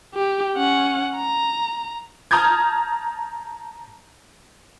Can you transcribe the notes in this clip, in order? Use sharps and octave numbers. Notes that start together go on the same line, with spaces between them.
G4
C#4 F#5
A#5
A5 A#5 D#6 F6 G6 G#6